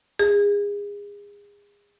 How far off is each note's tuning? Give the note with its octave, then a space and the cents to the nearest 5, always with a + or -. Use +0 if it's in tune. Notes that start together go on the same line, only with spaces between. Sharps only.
G#4 -30